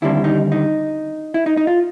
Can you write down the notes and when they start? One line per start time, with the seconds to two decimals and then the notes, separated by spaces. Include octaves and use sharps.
0.02 D#2 D3 G3 C4 E4
0.24 D#4
0.52 D#4
1.34 E4
1.46 D#4
1.57 D#4
1.67 F4